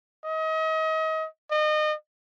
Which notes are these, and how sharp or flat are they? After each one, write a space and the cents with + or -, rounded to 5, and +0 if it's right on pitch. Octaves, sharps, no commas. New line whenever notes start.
D#5 +35
D#5 -30